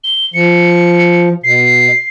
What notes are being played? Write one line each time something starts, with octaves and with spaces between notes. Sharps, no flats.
G7
F3 C#7
B2 C7